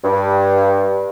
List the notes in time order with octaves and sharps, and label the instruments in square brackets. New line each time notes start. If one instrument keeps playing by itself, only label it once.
[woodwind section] G2